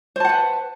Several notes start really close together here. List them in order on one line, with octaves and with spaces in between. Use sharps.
C5 A5 F#5 B4